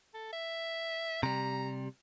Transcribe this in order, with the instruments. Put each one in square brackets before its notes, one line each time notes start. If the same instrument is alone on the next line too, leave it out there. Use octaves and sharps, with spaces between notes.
[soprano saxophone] A4
E5
[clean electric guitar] C3 G3 [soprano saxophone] A#5